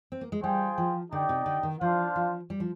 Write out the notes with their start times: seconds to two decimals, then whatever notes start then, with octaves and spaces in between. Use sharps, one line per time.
0.12 C4
0.21 A#3
0.32 G#3
0.43 G3 F4 G#4 C5 G5
0.78 F3
1.11 D3 D#4 G4 D5 G5
1.29 C3
1.46 D3
1.63 D#3
1.81 F3 D4 F4 C5 F5
2.16 F3
2.50 G3
2.60 F3